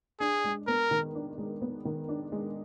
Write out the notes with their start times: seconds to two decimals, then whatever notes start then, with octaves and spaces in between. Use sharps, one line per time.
0.20 D4 G#4
0.44 G#3
0.67 B3 A#4
0.91 D#3
1.15 D4
1.38 G#3
1.62 B3
1.85 D#3
2.09 D4
2.32 G#3